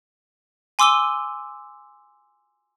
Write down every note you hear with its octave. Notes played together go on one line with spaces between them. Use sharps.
G#5 C6 D6 E6 D#7 G7